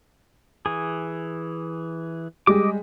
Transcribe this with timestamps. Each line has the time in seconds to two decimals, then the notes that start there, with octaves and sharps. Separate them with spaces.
0.66 E3 G#4
2.47 G3 G#3 D#5 D6